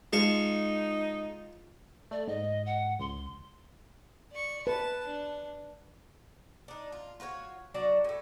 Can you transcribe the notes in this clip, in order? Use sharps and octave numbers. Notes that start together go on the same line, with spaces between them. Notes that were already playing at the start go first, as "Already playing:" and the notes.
G#3 D#4 F4 A5 C#6
A3 D5
G#2 D#5
F#5
C#2 C6
D5 C#6
B4 A5
D4
D4 D#4
F4
F4 F#4 B4 C#5
F#3 D4 F#4 D5
A2 A3